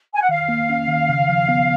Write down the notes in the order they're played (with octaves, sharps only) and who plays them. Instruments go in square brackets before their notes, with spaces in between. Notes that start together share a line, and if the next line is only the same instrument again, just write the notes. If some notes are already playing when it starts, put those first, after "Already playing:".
[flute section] G#5
F#5
[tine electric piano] D#3 [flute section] F5
[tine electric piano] A#3
C#4
D#3
C#3
F3
B3